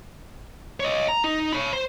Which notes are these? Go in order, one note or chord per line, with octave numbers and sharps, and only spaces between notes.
C#5 D#5
A#5
D#4
C#5 B5
C5